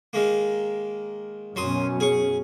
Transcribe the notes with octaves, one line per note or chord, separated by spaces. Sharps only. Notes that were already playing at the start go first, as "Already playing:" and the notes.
D#3 G#3 A#3
F#2 B2 F#3 C#4 C6 D#6
G#4 C#6